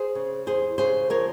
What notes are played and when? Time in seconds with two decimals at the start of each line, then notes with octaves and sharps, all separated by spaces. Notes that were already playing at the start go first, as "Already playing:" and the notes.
Already playing: G#4 C5
0.15 C#3
0.46 E2 G#4 C5
0.78 C#3 G#4 C5
1.10 F3 A#4 C#5